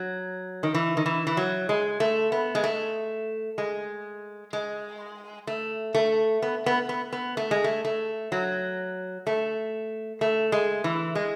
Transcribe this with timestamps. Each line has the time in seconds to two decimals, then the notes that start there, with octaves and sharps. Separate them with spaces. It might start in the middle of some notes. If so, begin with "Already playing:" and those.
Already playing: F#3
0.63 D#3
0.74 E3
0.97 D#3
1.06 E3
1.27 E3
1.37 F#3
1.69 G#3
2.00 A3
2.32 B3
2.55 G#3
2.64 A3
3.58 G#3
4.53 G#3
5.47 A3
5.95 A3
6.42 B3
6.66 B3
6.89 B3
7.13 B3
7.37 A3
7.51 G#3
7.64 A3
7.85 A3
8.32 F#3
9.27 A3
10.21 A3
10.52 G#3
10.84 E3
11.15 G#3